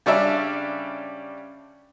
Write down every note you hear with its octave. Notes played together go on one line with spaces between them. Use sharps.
C#3 G3 C#4 D4 E5